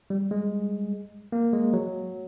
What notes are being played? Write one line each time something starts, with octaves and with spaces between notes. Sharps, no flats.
G3
G#3
A#3
G#3
F#3